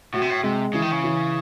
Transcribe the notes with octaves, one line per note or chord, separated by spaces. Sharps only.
A2 F#4
C3
A2
C3 G#3
C#3 E3
D#3
C#3
E3